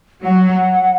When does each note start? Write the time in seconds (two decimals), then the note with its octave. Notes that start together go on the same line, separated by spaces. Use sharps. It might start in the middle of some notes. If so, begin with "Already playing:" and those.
0.24 F#3 F#5